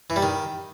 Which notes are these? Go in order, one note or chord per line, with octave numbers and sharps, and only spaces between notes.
E3
G3
D#3